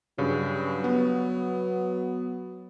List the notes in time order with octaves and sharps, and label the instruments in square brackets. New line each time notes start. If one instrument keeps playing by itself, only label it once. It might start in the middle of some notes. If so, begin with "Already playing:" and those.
[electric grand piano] G2 C#3 [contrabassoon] F#3
[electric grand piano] B3